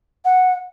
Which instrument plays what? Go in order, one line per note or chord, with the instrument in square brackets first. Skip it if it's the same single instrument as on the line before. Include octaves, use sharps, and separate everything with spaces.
[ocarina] F#5